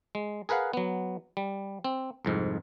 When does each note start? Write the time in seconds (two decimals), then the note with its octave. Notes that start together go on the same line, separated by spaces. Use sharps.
0.15 G#3
0.49 G#4 A#4 B4 F5 F#5
0.73 F#3 B3
1.37 G3
1.84 C4
2.25 C2 F2 G#2